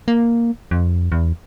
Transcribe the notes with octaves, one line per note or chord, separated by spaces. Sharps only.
A#3
F2
E2